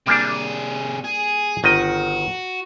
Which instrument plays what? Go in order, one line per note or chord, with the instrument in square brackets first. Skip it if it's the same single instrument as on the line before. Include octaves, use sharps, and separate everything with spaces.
[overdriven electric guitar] C3 G#4 [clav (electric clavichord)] G3 A#3 D4
[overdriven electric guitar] G#4
[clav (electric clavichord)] G1 D#3 D#5 [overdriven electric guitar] F#4